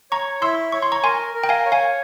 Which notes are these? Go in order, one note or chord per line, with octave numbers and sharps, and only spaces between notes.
C#5 A#5 C#6
E4 C6 E6
C#5 C#6
C6
A#5 C#6
A#4 G#5 C6
A#4
G5
F5 G#5
C#5
F5 G#5